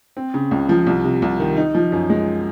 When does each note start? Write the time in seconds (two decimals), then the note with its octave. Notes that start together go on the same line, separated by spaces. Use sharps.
0.17 C4
0.34 C#3
0.51 C#2
0.69 F3
0.87 C2
1.04 C3
1.22 C2
1.40 D#3
1.57 D#4
1.75 F3
1.92 F#2
2.10 G#3